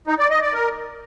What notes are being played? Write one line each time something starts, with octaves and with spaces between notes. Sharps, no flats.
D#4
D5
D#5
D5
A#4